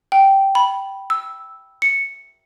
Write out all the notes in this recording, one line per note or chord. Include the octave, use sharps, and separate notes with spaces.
G5
B5
E6
C#7